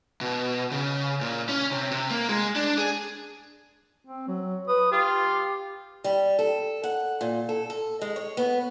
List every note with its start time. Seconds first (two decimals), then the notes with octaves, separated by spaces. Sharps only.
0.21 B2
0.71 C#3
1.21 A#2
1.49 C#4
1.71 C3
1.91 C3
2.10 A#3
2.29 G#3
2.56 D4
2.78 G#4
4.06 C4
4.28 F#3
4.68 B4 D#6
4.92 F4 G4
6.04 G3
6.39 A4
6.83 F#5
7.21 A#2
7.49 A4
7.70 A4
8.01 G#3
8.16 C#5
8.37 B3